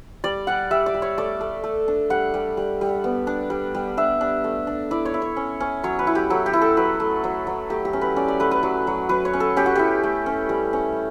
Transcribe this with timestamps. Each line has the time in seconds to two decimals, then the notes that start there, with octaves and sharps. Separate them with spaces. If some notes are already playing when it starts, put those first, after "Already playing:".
0.24 G3 D5
0.47 G3 F#5
0.71 G3 E5
0.86 D5
0.94 G3
1.02 C#5
1.18 A3 D5
1.41 A3
1.64 A3
1.88 D4
2.10 G3 F#5
2.34 G3
2.57 G3
2.81 G3
3.04 B3
3.27 D4
3.50 G3
3.74 G3
3.97 D4 E5
4.21 D4
4.44 A3
4.67 D4
4.91 E4 D5
5.05 C#5
5.14 E4
5.22 C#5
5.36 C#4
5.60 C#4
5.83 F#3 C#5
5.99 B4
6.07 E4
6.15 G4
6.30 F#3 A4
6.46 G4
6.53 E4
6.61 A4
6.77 F#3 B4
7.00 A3
7.24 F#3
7.47 F#3
7.70 A3 G4
7.85 G4
7.93 C#4
8.01 B4
8.16 C#4 D5
8.28 D5
8.40 A3 B4
8.51 B4
8.63 F#3
8.87 F#3
9.09 F#3 B4
9.25 C#5
9.33 C#4
9.40 A4
9.56 C#4 G4
9.66 F#4
9.75 E4 G4
10.03 A3
10.26 C#4
10.49 G3
10.73 C#4